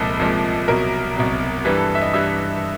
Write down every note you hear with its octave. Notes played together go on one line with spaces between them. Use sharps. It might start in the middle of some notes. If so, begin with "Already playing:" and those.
Already playing: C2 A#2 F3 G#3 A4
C2 A#2 F3 G#3
C2 B2 F#3 A#4
C2 B2 F#3
G2 E3 G3 B4
A4
E5
D#5
G2 E3 G3 E5